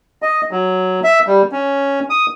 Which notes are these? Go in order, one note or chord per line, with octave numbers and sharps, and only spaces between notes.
D#5
F#3
E5
G3
C#4
D#6